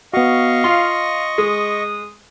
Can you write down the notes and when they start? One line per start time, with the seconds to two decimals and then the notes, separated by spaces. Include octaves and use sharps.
0.14 B3 F#4 D#5 F5 C#6
0.64 F4 C6
1.38 G#3 D#6